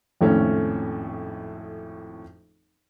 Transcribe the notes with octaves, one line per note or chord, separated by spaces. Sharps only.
G#1 F2 A2 A3 C#4 F4